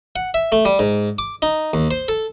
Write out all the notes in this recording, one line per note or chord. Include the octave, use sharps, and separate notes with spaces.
F#5
E5
A3
G3
G#2
D6
D#4
D#2
C5
A4